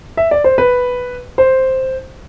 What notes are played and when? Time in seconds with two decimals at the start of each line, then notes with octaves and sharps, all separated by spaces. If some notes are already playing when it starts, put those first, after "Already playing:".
0.17 E5
0.31 D5
0.44 C5
0.58 B4
1.38 C5